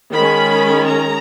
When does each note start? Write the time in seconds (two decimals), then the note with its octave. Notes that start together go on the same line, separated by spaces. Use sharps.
0.14 D#3 G#3 C#4 B5
0.88 A#5